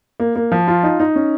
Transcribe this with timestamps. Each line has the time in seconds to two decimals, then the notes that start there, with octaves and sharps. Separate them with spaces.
0.20 A#3
0.36 A#3
0.52 F3
0.68 F4
0.83 D#4
1.00 D#4
1.15 C#4